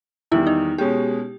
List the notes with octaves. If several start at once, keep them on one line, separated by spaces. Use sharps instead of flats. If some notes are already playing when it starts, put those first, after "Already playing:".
E2 D#3 G3 E4
D#4
B2 G#3 C#4 G4